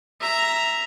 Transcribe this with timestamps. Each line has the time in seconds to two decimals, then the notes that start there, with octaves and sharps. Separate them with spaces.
0.20 E5 A#5